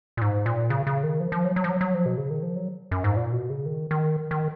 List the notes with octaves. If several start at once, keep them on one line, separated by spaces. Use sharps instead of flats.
A#2
G#2
A#2
C#3
C#3
D#3
F3
F3
F#3
F#3
F3
F#3
F#3
F3
B2
C#3
D#3
F3
F#3
F#2
G#2
A#2
B2
C#3
D#3
D#3
D#3